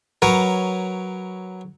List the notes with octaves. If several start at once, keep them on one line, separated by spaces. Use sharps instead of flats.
F#3 A#4 B4 C#5